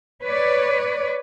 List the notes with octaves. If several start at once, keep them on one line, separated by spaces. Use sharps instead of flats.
B4 C#5 D5